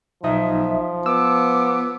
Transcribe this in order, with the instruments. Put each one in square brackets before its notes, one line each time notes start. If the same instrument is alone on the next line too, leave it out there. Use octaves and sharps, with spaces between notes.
[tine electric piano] B1 D#4 D#6 [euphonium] F3 [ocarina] E5
[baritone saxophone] B3 [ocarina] D6 [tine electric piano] E6